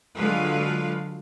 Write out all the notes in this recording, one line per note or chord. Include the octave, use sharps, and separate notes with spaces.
D3 F#3 G#3 F4 B4 F5